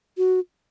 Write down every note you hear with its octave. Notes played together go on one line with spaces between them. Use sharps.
F#4